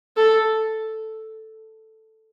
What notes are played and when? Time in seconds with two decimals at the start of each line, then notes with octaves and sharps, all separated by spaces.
0.17 A4